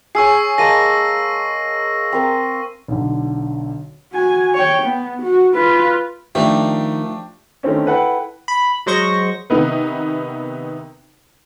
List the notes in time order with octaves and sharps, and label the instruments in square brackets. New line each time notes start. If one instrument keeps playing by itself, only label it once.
[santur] G#4 C#5 [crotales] C#6 E6 C7
[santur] G#3 A#3 A5 [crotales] A#6 D#7
[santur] C4 A#4
[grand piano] B1 D3
[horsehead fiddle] F#4 G#5
C#5 G5
B3
F#4
F4 B4
[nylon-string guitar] D#3 [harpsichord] F3 A3 [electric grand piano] D4 G4
[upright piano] D3 D#3 A3 C4 C#4
E4 A4 B4 F#5 G5
[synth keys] B5
F#3 G#3 C5 C#6 A#6
[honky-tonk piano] C3 D#3 B3 D#4 B4